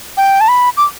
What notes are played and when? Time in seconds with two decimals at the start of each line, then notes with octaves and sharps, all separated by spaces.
0.17 G5
0.41 A5
0.48 B5
0.77 D6